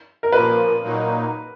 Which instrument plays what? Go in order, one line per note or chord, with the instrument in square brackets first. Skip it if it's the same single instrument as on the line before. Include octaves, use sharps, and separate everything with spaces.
[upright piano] A#4
[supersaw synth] A#2 F3 A#3 [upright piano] B4
[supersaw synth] A#2 F#3 A#3 D#4